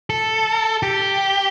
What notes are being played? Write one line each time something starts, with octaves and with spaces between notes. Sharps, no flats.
A4
G4